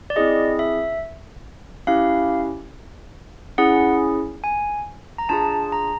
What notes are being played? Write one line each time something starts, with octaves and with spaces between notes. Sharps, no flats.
D5
C4 E4 G#4 D#5
E5
C#4 E4 G4 F5
C#4 E4 G#4 F#5
G#5
A#5
D4 F4 G#4 A5
A#5